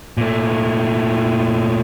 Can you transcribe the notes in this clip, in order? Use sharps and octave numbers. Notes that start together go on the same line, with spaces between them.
A#2 A3